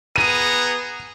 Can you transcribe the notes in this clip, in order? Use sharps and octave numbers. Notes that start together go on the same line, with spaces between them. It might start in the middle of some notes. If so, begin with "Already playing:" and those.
B3 G#4 A#5 D#7